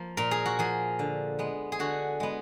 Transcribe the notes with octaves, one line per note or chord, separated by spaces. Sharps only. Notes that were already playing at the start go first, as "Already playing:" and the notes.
Already playing: F3 A#3
A#2 A#4
G#4
F#4
F3 A#3 G#4
D3
G#3 B3
G#4
D3 F#4
G#3 B3